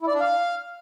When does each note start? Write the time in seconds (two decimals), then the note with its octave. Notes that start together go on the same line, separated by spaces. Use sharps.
0.01 E4
0.08 D5
0.14 D4
0.20 F5